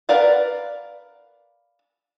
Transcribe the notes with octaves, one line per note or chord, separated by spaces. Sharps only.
A#4 B4 D5 F5 F#5